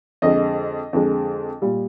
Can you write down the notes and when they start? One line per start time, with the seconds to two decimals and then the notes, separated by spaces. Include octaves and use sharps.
0.22 F2 D3 G#3 D#5
0.93 F2 D3 G#3
1.62 A#2 G3